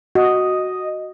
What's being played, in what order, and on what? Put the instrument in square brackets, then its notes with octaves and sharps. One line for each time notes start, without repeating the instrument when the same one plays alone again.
[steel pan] F#4 [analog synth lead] D#5